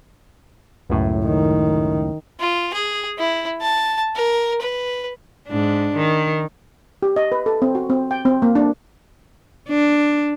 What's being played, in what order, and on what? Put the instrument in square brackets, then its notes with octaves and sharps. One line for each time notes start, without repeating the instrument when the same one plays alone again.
[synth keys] C#2 F#2 A2
[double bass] D#3
[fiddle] F4
G#4
E4
A5
A#4
B4
[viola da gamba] G#2 D4
D#3
[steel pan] G4
D#5
B4
A4
C4
F#4
C4
G5
C4
A#3
D4
[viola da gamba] D4